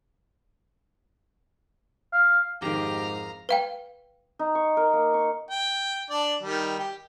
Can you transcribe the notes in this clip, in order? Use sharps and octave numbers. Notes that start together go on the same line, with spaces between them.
F5
F2 G#2 D#3 G4 F5 A#5
B4 F5 G5
D#4
C#6
A#4
A#3
C#6
G5
D4 D5
D#3 G3
G4